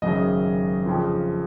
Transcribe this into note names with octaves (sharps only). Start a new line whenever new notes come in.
G#1 F#2 C#3 F#3 D#5
F2 C#3 F3